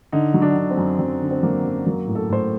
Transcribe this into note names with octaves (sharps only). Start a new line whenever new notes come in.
D3 D#4
F#3
D4
D3
C4
F#2
F#2 C4
D3
C4
F#3 A#3
F#2
F#3 A#3
A2
A4
A2 C5